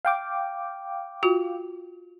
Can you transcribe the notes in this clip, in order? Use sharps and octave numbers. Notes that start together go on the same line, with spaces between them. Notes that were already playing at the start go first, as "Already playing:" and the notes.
F5 G5 D6
F4 F#4